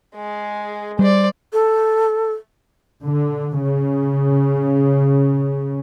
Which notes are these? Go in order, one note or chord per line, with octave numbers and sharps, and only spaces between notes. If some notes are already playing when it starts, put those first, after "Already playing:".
G#3 G#4
G3 C5 D5
A4
D3
C#3